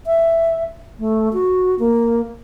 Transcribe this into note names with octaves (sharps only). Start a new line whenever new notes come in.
E5
A3
F#4
A#3